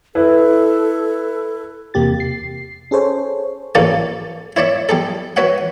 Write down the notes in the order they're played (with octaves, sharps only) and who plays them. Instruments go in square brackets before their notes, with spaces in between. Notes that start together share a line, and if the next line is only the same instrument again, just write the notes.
[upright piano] E4 B4 [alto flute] A4
[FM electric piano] E2 C3 A#3 G4 A6
C7
C#4 G#4 A4 C5 C#5
[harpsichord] A1 C#3 A#3 C#4 A4 D5
E4 C#5 D5 E5
G3 G#4 A4
F#4 B4 C#5 E5 F#5